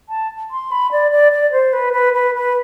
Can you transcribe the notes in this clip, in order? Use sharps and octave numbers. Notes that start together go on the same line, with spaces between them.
A5
C6
B5
D5
D5
D5
C5
B4
B4
B4
B4